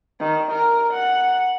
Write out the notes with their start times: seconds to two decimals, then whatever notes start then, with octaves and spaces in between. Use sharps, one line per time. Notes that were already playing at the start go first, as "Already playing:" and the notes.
0.20 D#3
0.52 A#4
0.93 F#5